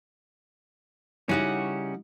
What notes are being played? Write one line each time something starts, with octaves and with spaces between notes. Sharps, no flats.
C#3 G3 C#4 D#4 E4 F#4 F#5